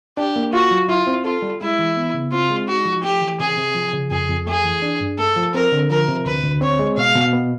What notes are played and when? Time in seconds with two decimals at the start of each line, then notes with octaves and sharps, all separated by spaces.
0.17 D4 G4
0.36 A#3
0.53 F4 F#4
0.71 F#3
0.88 E4 F4
1.07 C4
1.25 F4 A4
1.42 G3
1.61 G#3 E4
1.79 E3
1.96 B3
2.14 C#3
2.32 C4 F4
2.50 G#3
2.68 D#4 F#4
2.85 F3
3.03 A3 G4
3.22 E3
3.40 C3 G#4
3.57 C3
3.75 F3
3.93 C#3
4.11 F2 G#4
4.30 F2
4.47 A3 G#4
4.64 E3
4.82 D4
5.00 G2
5.18 A3 A4
5.36 F3
5.54 C4 A#4
5.72 D3
5.90 F3 A#4
6.08 C3
6.26 D2 B4
6.44 D2
6.61 C4 C#5
6.79 G#3
6.97 B2 F5
7.15 B2
7.33 B3